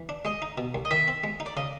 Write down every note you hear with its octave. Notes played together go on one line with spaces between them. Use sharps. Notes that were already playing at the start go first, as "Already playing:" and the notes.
Already playing: E3
D4
G#3 D#5
D#4
B2
C2
D#5
D#3 E5
C4
G#3
D#4
D5
C#3 D#5